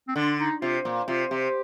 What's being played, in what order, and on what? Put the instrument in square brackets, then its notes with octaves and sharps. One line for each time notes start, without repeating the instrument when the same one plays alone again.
[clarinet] C4
[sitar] D3 [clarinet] D4
[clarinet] D#4
[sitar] C3 [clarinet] F4
[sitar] A#2
[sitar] C3 [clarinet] F4
[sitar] C3 [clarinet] G4